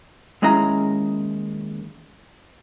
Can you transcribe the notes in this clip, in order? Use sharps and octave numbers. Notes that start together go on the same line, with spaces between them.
D#2 G#3 C#4 E4 A#5